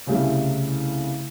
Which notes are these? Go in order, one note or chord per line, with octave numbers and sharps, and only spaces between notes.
C2 C#3 G3 A3